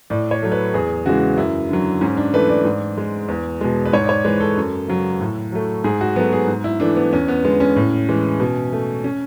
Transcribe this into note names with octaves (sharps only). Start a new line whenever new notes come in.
A2 D5
C#5
F#3 A3
B4
E2 G#4
C#3 E3 G#3 F#4
F#2 E4
D3 F#3
G#2 C#4
D4
E3 A3 B4
D5
G#2
G#3
E2
B2 G#3
B4
G#2 C#5
D5
C#5
E3 G#3 B4
A4
F#2
C#3 F#3
A2
F#3 A3
G#2 G#4
F#4
F#3 A3 B3
G#4
G#2
E4
E3 A3 D4
B3
E2 C#4
B3
D3 G#3 B3
C#4
A2
E3 G#3
B2
A3
C#4